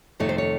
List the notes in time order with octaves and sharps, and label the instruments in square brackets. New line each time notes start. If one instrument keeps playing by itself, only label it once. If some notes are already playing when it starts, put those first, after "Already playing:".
[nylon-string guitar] F2 C3 D#3 A3 C#5
C5
C#5